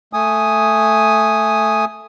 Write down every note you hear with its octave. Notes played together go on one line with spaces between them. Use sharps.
A3 G#5 D#6